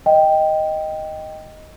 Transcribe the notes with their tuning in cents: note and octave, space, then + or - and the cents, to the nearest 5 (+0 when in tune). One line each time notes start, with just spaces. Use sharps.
D#5 +0 G5 +0